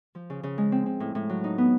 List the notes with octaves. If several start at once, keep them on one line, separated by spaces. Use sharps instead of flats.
F3
C#3
C#3
G#3
C4
C4
A2
A2
F#3
D#4
B3